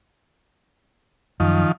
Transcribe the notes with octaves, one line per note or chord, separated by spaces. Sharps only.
F#2 D#3 F3